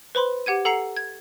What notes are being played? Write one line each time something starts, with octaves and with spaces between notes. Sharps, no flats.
B4 C5 B5 C6
G4 F#5 G#6 D#7
A4 F#5 A#5 C7 C#7
G#6